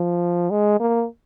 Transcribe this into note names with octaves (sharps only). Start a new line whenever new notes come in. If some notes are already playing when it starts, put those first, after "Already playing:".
Already playing: F3
G#3
A#3